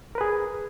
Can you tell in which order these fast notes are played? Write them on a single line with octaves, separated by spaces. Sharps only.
A#4 B4 G#4